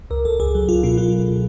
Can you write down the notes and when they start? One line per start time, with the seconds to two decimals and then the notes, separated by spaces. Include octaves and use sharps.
0.10 C#2 A#4
0.25 C#2 A4
0.40 C#2 G#4
0.55 F#3
0.69 C#2 F4
0.83 B2 F4
0.98 F#3 F4